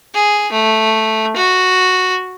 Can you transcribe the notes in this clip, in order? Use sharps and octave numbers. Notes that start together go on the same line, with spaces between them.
G#4
A3
F#4